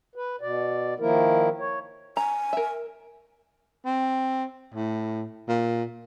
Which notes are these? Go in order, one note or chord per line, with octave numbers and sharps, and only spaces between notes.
B4
B2 D5
D#3 F3 A#3 E4 A#4
C#5
G#5 A#5
A#4 E5
C4
A2
A#2